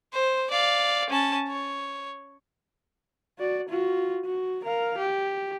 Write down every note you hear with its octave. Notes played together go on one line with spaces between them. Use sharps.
C5
D5 F5
C#4 A5
C#5
F#4 D5
F4 F#4
F#4
A#4 F5
G4